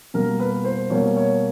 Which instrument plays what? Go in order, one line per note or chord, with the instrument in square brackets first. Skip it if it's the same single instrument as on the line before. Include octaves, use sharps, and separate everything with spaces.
[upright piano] B2 G3 A#3 A#4
B4
C5
B2 G3 A#3 C#5
C#5